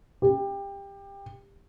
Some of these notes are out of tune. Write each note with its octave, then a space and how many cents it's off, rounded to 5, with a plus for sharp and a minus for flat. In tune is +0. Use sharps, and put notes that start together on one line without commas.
G4 +20